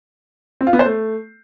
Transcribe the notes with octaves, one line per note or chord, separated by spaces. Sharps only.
C4
F4
B3
C5
A3